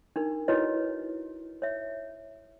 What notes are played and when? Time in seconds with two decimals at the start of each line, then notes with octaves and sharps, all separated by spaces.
0.16 D4 D#4 A#4
0.48 D#4 E4 F#4 B4 C#5 D#5
1.62 C#5 E5